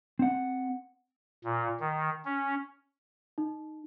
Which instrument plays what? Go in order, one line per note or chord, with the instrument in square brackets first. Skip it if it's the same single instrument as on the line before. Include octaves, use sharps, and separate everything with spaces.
[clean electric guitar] C4 F#5
[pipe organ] A#2
D#3
C#4
[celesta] D#4